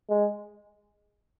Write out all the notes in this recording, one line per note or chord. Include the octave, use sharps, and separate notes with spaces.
G#3